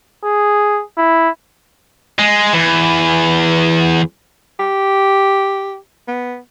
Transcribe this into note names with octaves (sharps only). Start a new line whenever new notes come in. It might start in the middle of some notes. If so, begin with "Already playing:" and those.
G#4
E4
G#3
E2
G4
B3